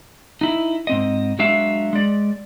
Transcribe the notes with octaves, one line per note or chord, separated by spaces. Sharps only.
D#4 E4
G#2 C4 D#5
F#3 G#3 D4 F#4 E5 F5
G#3 D5